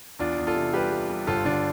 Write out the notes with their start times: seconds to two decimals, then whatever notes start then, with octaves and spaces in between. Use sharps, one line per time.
0.19 E2 D4 F4
0.38 E2
0.47 F4 A4
0.55 C3
0.73 G3 G4 B4
0.91 G3
1.10 G3
1.27 G1 F4 A4
1.45 D3 D4 F4